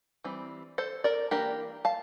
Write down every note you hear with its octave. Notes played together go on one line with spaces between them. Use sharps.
E3 G3 C4
A4 C5
A#4 D5
E3 A#3 D4 G4 A#4
F5 A5